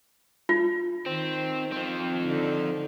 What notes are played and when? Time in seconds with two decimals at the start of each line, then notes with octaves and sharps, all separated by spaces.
0.49 F4
1.06 D#3 C4
1.72 F3 C4
2.20 D3 D#4